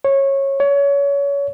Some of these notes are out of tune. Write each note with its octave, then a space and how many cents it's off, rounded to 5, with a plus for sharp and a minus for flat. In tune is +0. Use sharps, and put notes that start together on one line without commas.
C#5 -20
C#5 +25